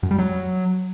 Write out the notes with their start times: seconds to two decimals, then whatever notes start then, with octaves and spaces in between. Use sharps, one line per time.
0.03 F#2
0.11 G3
0.18 F#3